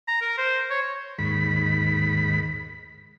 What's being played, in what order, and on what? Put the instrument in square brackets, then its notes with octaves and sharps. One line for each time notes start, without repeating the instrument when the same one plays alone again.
[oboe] A#5
A#4
C5
C#5
[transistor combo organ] D#2 G#2 B5